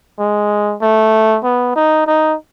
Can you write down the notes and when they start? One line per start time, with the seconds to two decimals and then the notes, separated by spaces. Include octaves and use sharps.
0.19 G#3
0.81 A3
1.44 B3
1.75 D#4
2.07 D#4